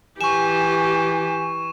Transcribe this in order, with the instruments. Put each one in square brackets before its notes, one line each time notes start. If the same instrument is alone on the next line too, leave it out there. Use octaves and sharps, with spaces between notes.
[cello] E3 [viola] G4 [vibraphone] G#5 [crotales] C#6 E7